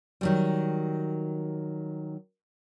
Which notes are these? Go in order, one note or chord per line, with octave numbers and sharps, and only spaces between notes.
D#3 F#3 G3